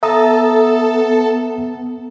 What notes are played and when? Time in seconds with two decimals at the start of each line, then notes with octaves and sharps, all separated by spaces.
0.03 B3 A4 E5 A5 A#5 D#6